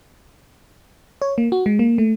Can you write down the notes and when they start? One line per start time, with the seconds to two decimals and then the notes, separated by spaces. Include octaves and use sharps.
1.22 C#5
1.38 A#3
1.52 F#4
1.66 G#3
1.79 A#3
1.98 A3